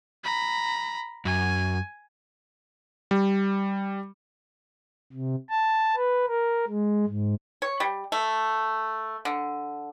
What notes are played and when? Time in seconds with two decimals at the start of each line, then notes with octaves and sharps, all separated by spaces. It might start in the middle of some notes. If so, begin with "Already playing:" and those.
0.23 A#5 B5
1.25 F#2 G#5
3.11 G3
5.12 C3
5.49 A5
5.96 B4
6.28 A#4
6.68 G#3
7.06 G#2
7.62 C#5
7.80 G3
8.12 A3
9.25 D3